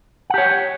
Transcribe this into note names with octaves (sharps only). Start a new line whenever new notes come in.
G4 C#5 F#5